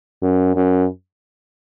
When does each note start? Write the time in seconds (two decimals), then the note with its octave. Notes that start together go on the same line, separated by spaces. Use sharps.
0.22 F#2
0.55 F#2